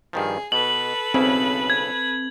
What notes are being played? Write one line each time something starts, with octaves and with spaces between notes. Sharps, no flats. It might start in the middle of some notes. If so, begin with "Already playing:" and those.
G2 D#3 F3 G#4
B2 A4 B4 F#7
B1 C#3 C4 E4
G#6